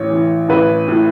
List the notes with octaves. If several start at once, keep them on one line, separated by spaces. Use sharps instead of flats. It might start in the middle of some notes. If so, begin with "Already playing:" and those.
Already playing: A1 C#5
E3
A1 B4
A2